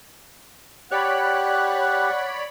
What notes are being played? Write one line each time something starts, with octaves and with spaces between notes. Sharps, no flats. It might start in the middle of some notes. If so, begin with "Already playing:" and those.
G4 C#5 D5 F#5 B5 F#6